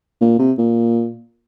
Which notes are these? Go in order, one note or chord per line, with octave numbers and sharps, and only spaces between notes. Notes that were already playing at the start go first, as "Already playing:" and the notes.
A#2
C3
A#2